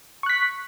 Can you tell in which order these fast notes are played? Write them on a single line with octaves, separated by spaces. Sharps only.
C#6 F#6 B6